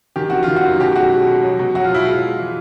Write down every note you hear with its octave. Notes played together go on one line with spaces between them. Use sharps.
D#3 G4
D#3 F#4
D#3 F4
F#4
F#2
B2 G4
G#3 F#4
G#3
G#3
F#3
B2
F#3 F#4
F4
F#3 E4
G#3 F4
G#3
E3